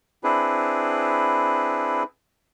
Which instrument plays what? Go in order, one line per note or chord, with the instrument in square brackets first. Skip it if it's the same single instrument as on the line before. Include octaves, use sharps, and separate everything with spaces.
[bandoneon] C4 D4 E4 G#4 B4